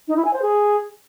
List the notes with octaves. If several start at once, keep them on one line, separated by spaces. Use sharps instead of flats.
D#4
E4
G#5
C5
G#4